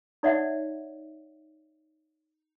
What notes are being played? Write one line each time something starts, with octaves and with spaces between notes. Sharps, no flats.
D#4 C#5 D5 E5 F#5